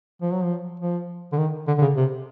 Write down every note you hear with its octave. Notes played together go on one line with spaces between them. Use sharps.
F3
F#3
F3
F3
D3
D#3
D3
D3
C#3
C3